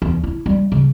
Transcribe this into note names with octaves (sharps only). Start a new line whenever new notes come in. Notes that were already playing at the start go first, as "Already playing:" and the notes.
E2
E4
G3
C#3